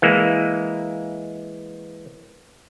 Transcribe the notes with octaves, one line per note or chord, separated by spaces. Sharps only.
E3 G#3 A#3